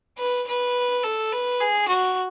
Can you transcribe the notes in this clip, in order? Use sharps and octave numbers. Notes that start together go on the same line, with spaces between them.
B4
B4
A4
B4
G#4
F#4